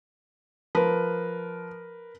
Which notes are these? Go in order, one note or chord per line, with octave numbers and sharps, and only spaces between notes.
F3 A#4 B4